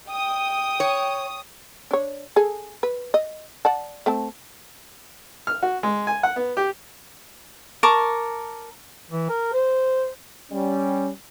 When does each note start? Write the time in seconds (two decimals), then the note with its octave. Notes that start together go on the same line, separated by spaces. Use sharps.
0.10 G5 D#6
0.80 C#5
1.91 D4 C#5
2.36 G#4 A4
2.83 B4
3.14 D#5
3.65 D5 F#5 A5
4.06 A3 C4 A5
5.47 F6
5.62 F#4
5.83 G#3
6.07 G#5
6.23 F#5
6.36 B3
6.57 G4
7.83 A#4 A5 C#6 D6
9.11 E3
9.30 A#4
9.53 C5
10.52 G3 C#4